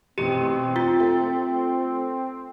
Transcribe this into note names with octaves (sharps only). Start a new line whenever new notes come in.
A1 B2 C4 G4 D#7
F4 A6
A3